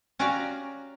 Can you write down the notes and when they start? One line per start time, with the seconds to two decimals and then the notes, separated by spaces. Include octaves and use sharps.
0.19 C#4 F#4 G4 D5 F5 A#5